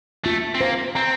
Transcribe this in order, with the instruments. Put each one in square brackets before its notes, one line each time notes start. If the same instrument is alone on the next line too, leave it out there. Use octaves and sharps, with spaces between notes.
[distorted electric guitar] A3 [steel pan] F4
[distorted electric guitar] C4
[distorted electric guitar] A#3 [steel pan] C5
[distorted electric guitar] C4 [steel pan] A#5